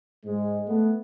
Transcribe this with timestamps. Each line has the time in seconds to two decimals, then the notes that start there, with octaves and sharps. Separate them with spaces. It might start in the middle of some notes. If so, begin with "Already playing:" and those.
0.25 G#2 G#3
0.67 A3 B3